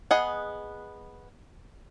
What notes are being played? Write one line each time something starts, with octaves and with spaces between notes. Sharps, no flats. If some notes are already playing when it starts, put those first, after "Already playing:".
B3 G#4 D#5 F#5